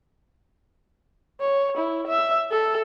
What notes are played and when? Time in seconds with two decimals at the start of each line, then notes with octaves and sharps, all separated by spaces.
1.41 C#5
1.78 E4
2.08 E5
2.51 A4